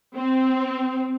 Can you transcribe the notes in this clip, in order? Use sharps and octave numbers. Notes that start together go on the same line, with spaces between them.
C4